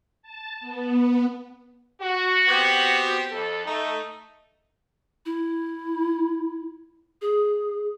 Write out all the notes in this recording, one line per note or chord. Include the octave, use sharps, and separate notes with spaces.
A5
B3
F#4
B3 C4 G4
F2 A4
A3 D#4
E4
G#4